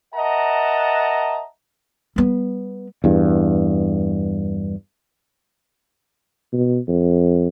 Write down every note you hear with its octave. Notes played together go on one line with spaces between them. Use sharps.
A#4 D#5 E5 F#5 A5 A#5
G3 B3
E2 G2
B2
F2